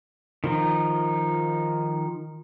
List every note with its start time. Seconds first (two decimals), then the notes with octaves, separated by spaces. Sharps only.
0.44 D#3 F3 D#4